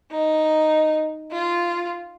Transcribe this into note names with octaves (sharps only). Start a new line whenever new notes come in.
D#4
F4